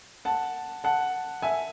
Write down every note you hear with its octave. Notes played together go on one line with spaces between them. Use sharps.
F#5 A5
F#5 A5
E5 G#5